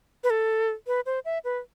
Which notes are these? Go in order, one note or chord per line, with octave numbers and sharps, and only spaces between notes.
B4
A4
B4
C5
E5
B4